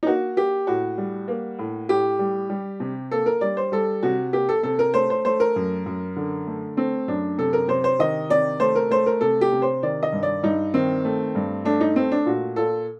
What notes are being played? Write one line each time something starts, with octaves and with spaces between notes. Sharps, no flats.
D#4
A#3 F#4
A#3 G4
A2 F#4
G3
A#3
A2
A2 G4
G3
G3
C3
A#3 A4
A#4
G3 D5
C5
G3 A4
C3 F#4
A#3 G4
A4
C3 A4
A#4
A3 C5
C5
A3 C5
A#4
F#2
F#2
D3
A3
A3 C4
F#2 D4
C3 A4
A#4
C3 C5
C5
D#3 D#5
C3 D5
A3 C5
A#4
A3 C5
A#4
C3 A4
G4
C3
C5
D#3 D5
D#5
G2
D5
G2 D#4
D#3 C4
A3
G2
A3 D4
D#4
A3 C4
D4
A#2 F#4
A#2 A4